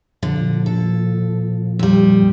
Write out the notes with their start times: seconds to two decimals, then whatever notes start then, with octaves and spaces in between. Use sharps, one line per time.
0.23 A#2 D3 F3
0.66 A4
1.79 F2 G3